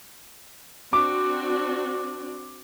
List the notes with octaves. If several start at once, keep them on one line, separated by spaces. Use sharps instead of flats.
C4 D4 F#4 D6